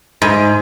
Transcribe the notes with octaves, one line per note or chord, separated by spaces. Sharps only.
G#2